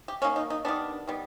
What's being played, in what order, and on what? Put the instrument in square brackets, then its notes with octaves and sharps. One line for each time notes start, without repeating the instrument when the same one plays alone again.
[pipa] G4
D#3 F#3 A#3 C#4
D#4
D#4
D#3 G3 B3 D4
D#3 G3 B3